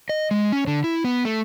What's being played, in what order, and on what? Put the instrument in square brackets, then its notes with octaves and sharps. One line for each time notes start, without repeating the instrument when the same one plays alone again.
[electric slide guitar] D#5
G#3
C#4
D3
E4
B3
A3